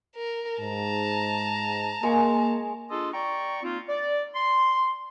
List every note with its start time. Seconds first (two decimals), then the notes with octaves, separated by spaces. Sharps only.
0.15 A#4
0.60 G#2 A5 A#5
2.03 G#3 A#3 G#4 C#6
2.90 D4 F4 G#4 A4 D#5 C6
3.13 D5 G5 A#5 C#6
3.63 A#3 C4 D#4 F4
3.88 D5
4.35 C6